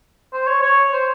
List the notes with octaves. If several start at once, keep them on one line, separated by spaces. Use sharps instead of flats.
C5
C#5
C#5
C5